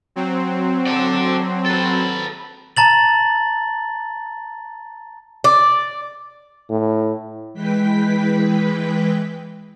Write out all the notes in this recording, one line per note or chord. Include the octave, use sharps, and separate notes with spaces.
F#3 C4
A4 D5
A4 B4
A5 A#5 A6 F#7
D5
A2
E3 G#3 B4 G5 B6